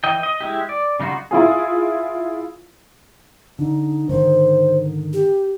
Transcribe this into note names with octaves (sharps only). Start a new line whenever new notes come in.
E3 D#5 G5
D#5
G#3 E4 G4
D5
C#3 G3 D#4 F4 F#4
E4 F4 G#4
D3 D#4
G#2 D3 D#3 C5
G4